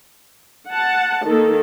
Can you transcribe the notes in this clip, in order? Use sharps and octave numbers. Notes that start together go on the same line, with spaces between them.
F#5 A5
D#3 A#3 A4